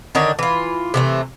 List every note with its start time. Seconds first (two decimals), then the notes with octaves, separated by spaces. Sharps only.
0.15 D3 D#3 D4 C#5
0.39 E3 F4
0.94 C3 E3 A3